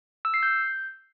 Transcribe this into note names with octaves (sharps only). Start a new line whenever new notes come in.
E6
C7
G6